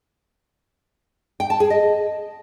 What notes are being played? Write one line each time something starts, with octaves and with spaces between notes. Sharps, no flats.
G5
A5
G#4
D#5